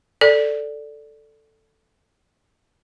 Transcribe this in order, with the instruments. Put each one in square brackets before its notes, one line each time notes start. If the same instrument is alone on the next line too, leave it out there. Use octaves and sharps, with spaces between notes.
[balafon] A4 D5